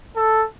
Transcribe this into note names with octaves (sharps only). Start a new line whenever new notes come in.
A4